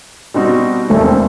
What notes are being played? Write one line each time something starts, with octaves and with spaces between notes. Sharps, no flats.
B2 G3 C4 D#4 F#4
E1 D#2 D#3 G3 A3
C4